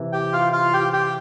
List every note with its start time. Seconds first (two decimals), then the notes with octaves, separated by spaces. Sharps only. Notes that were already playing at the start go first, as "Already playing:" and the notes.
Already playing: C3 E3
0.13 G4 G5
0.32 F4 F5
0.53 F4 F5
0.74 G4 G5
0.93 G4 G5